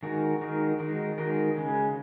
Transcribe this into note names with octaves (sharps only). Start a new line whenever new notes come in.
D#3 G#3 D#4 F#4 A#4
D#3 G#3 D#4 F#4 A#4
D#3 G#3 D#4 F#4 A#4
D#3 G#3 D#4 F#4 A#4
C#3 G#3 C#4